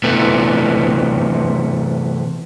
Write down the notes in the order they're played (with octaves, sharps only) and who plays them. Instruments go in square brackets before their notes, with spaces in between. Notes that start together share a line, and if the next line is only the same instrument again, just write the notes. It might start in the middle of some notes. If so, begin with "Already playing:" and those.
[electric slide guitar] C3 E3 A3 B3